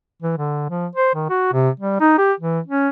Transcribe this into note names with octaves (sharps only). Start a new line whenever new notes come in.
E3
D3
F3
C5
D#3
F#4
C3
G3
D#4
G4
E3
C#4